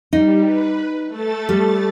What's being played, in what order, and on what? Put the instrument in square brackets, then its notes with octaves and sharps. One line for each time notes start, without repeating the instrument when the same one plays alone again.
[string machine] G3 [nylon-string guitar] D#4
[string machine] B4
A3 A4 A6
[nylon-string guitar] G3